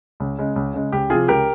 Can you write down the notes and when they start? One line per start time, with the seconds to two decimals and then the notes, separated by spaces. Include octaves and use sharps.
0.20 C#2
0.38 C#3 G#3
0.56 C#2
0.74 C#3 G#3
0.92 C#2 G4
1.10 C3 F3 F4 G#4
1.28 C#2 G4 A#4